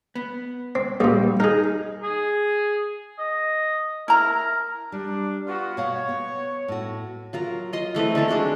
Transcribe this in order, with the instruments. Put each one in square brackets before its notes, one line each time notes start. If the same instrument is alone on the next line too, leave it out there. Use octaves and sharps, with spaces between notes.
[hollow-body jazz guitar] B3
[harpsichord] C4
[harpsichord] A#1 A#2 [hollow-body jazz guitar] G3
[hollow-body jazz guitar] D#4 [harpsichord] G#4 A#4
[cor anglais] G#4
D#5
[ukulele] E4 A#5 [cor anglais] A#4
[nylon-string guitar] G3 [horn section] D4
[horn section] B3 F4 F#4
[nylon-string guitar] B2 F5 F#5 [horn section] C#5
[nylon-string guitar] B3
A2 F#4
[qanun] F#3 F4 A#4
F4 D#5 C6
E3 A3 C4 B4
D3 G#3 A4 A#4
G#3 D4 F#4 A4